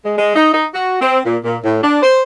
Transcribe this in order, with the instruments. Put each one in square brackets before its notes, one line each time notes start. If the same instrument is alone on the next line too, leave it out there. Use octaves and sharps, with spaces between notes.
[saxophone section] G#3
G#3
D#4
D#4
F#4
C4
A#2
A#2
A2
D4
C5